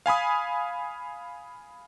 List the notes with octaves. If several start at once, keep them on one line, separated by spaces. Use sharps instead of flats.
F5 G#5 B5 D#6